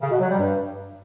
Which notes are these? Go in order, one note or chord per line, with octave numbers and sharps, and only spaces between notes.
C#3
B2
F#3
G3
G2